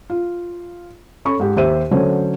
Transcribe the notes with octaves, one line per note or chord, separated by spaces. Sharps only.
F4
C#4 A4 B5 C#6
G#2 G4
D#2 G4 C5 E5 D#7
D3 F#3 A3 C#4 C5 C#5